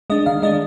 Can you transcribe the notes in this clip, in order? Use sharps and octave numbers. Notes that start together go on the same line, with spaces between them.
G#3 D4 D#5
D#3 F5
G#3 D4 D#5